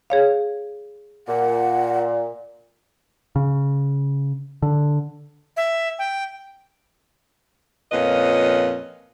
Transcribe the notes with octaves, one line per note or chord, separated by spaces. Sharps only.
G#4 C#5 F5
A#2 F#5
C#3
D3
E5
G5
F2 A#2 C#4 F4 B4 D#5